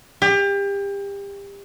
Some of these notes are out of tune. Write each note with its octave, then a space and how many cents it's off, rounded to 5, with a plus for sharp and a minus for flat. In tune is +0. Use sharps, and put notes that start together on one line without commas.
G4 +30